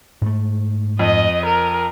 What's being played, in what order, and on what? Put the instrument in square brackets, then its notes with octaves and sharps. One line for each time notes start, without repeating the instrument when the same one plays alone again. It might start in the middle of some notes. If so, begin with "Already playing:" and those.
[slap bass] G#2 A3
[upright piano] F2 [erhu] D#5
[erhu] A#4